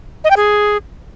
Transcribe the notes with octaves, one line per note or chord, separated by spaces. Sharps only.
D#5
G5
G#4